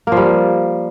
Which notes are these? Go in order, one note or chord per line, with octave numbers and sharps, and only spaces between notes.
F3 G3 A#3